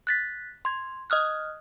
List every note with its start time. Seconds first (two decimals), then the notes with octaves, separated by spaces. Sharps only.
0.07 F#6 A6 B6
0.65 C6 G#6
1.10 D#5 D#6 F6 F#6